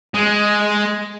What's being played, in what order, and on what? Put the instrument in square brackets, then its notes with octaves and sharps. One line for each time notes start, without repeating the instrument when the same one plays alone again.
[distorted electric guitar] G#3